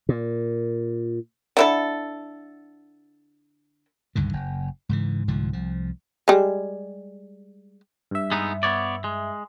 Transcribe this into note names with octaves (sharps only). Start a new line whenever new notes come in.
A#2
D3 E4 A4
C#2 G2 D3 D#3
F#1
G#2 C#3 E3
C2 G#2 D3 F3
C2 F3
G3 G#3
G2 E5
G#3 B3 D#4
B3 C#5 D5
G#3